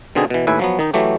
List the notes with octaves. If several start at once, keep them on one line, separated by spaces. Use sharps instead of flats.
B2 D3 C4 D#4 G#4
B2 E3
D#2 A2 B4 E5 G#5
F3 F#3 B3
D#3 D#4
E3 F#3 A3 G4